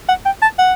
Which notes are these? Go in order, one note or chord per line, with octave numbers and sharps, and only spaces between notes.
F#5
G5
A5
F#5